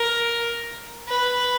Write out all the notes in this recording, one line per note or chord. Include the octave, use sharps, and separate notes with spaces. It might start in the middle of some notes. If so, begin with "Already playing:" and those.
Already playing: A#4
B4